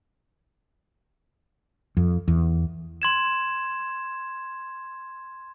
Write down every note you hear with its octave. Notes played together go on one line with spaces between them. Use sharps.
F2
E2
C6 G#6 E7